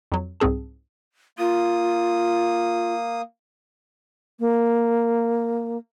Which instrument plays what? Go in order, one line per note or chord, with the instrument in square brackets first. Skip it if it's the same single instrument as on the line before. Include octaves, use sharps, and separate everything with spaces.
[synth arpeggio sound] F2 F#3
C2 G#2 C4 G#4 A5
[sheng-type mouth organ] A#3 D#6 [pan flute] F4
[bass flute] A#3